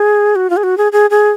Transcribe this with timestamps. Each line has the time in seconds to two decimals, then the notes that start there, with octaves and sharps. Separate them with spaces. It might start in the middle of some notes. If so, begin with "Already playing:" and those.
Already playing: G#4
0.36 F#4
0.50 F4
0.57 G#4
0.63 F#4
0.78 G#4
0.92 G#4
1.10 G#4